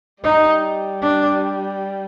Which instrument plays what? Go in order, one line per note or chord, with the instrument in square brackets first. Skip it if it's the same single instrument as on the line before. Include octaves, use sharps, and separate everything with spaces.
[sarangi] G3 [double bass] D#4
[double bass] D4